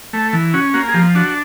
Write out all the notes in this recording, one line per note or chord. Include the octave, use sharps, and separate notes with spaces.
A3
E3
C#4 F#4
A#3 F#4
G#4
F3 G4
D4 F#4